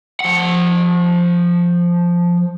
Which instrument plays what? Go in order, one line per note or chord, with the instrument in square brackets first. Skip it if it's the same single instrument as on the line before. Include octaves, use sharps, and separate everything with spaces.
[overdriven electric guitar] F3 F#5